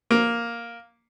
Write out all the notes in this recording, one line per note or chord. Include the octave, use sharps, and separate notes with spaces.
A#3